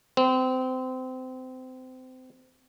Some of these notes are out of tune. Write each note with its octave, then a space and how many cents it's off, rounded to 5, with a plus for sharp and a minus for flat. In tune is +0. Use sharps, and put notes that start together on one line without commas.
C4 -25